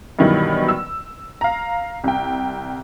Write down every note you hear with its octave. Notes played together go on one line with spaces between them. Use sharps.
G2 B2 D#3 E3 F#3 G3
E6
F5 A#5
C2 G5